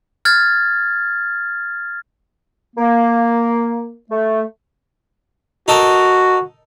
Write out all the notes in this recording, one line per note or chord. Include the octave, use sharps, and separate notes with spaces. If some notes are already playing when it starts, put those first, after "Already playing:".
F6 G#6 A6
A#3
A3
D#4 F#4 A4 A#4